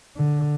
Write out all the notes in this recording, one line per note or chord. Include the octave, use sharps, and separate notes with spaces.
D3